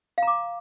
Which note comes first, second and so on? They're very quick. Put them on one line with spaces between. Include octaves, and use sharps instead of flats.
F5 A#5 D6